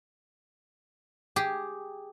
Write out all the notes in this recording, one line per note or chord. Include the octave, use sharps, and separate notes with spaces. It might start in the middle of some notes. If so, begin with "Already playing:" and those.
G4 G#4